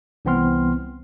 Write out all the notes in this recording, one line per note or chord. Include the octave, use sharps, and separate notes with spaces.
C2 E3 B3 C4 C6 F6